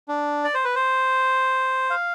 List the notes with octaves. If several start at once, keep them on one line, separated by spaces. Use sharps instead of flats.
D4
D5
C5
B4
C5
F5